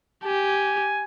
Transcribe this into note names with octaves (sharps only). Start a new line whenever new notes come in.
G4 G#5